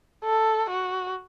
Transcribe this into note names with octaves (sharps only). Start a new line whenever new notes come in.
A4
F#4